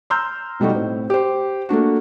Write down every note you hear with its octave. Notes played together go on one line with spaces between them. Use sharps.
A#5 C6 E6 F6 G6
B2 G3 A3 D#4 F#4
A2 C4
G4 C5
A3 A#3 D4 F#4